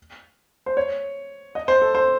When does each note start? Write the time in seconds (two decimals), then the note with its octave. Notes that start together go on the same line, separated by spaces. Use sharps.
0.66 C5
0.77 C#5
1.55 D#5
1.68 C5
1.82 A4
1.95 C5